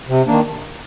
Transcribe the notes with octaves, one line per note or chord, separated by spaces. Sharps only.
C3
D#3 A#3 D4